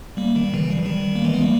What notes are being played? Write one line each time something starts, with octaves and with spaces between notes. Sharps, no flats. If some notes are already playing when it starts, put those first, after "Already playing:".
G3 A#3
D#3 G3
C#3 E3
G3
E3
D#3 G3
A#3
E3 G#3
B3
G3 A#3